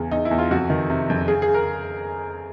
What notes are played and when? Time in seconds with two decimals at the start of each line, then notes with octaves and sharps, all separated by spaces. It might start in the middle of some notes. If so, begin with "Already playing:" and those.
Already playing: E2 C#3
0.11 E2 D#4
0.25 E4
0.31 E2
0.38 F4
0.51 F2 F#4
0.70 D#3
0.90 C3
1.10 F2
1.28 C#3 G#4
1.42 G#4
1.48 C#3
1.54 A#4